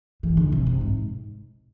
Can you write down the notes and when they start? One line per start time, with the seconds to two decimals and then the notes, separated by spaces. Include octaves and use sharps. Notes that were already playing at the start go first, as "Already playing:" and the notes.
0.23 E3
0.37 D3
0.52 C3
0.67 C3
0.81 G#2